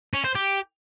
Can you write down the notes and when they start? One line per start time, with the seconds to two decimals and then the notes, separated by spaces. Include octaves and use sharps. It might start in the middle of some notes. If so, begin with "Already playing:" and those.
0.13 C#4
0.24 C5
0.35 G4